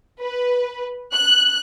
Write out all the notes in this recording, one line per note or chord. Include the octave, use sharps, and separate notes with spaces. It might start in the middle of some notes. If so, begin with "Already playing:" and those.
B4
F#6